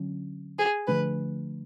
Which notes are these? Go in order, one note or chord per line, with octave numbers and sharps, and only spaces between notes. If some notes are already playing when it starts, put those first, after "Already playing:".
Already playing: D3 F#3 C#4
G#4
D3 F3 A3 D4 B4